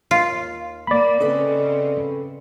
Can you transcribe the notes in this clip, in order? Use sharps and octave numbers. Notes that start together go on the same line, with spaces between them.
D#2 F4
A#3 D5 B5
C#3 C4 C#4 A4 B4 D#5